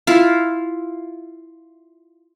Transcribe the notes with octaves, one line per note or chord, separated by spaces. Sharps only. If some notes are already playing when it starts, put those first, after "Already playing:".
E4 F4